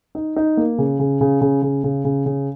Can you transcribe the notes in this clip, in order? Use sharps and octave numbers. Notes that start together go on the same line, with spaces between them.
D#4
D#4
A#3
C#3
C#3
C#3
C#3
C#3
C#3
C#3
C#3